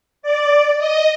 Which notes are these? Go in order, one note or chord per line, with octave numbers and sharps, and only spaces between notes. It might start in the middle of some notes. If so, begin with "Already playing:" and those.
D5
D#5